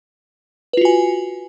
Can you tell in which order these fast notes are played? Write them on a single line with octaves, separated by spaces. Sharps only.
B4 F4 F#4 G#5